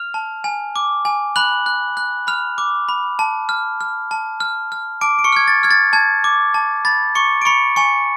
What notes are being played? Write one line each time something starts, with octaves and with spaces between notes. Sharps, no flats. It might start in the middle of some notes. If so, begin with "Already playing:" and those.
Already playing: F6 F7
A5
G#5
D6
G#5
B5 F#6 F#7
F#6
F#6
B5 F6 F7
D6
B5
A5
F6
F6
A5
F6
F6
A5 D6 D7
D7
C#6 C#7
F6 G#6
A6
F6 G#6
A6
A5 G#6
D6
A5
B5 A6
C#6 D6 C#7
D7
B5 C#6 C#7
G#5 C#6 C#7